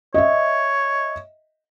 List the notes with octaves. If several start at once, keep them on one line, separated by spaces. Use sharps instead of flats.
C#5 D#5 E5